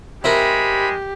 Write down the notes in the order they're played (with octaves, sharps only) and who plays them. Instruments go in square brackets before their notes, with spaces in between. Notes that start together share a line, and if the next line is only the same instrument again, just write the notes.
[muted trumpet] G#3 [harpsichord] C4 E4 A#4 [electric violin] G4 [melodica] B5